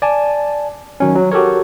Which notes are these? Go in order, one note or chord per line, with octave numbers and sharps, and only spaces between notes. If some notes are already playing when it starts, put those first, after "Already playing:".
D5 G#5 A5
D#3 F#3 C#4
F#3
F#4 G4 A4 A#4 C#5